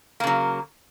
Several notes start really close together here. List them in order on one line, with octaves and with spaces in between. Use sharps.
A#3 C#3 F#3